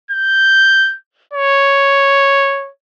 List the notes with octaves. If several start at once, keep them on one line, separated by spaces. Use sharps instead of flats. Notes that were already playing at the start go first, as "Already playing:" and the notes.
G6
C#5